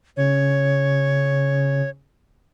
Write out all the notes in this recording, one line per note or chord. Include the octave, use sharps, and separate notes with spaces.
C#3 C#5